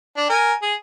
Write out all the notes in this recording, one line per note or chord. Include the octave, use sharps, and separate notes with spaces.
D4
A#4 G#5
G#4